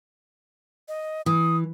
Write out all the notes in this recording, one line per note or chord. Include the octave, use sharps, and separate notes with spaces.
D#5
E3 D#6